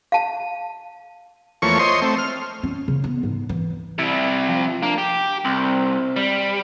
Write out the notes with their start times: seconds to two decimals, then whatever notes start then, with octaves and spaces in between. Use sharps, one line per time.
0.12 F5 A5
1.62 E2 F3 A3 A#3 C#5 C#6
1.79 C5 C#5 D#5 C6
2.02 A3 C4
2.18 F6
2.63 C#4
2.88 C#3
3.04 B3
3.23 G#2
3.49 E3
3.99 C3 G3 E4
4.48 F3
4.83 A#3 D4
4.98 G4 G5
5.45 C2 C4
6.16 G3